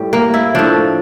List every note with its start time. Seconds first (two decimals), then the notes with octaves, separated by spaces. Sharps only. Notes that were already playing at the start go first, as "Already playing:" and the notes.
Already playing: A2 G3
0.13 A#3
0.34 E4
0.55 A2 F3 D4